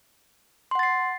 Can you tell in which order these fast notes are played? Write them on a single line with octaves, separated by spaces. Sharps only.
C6 F#5 A6 C7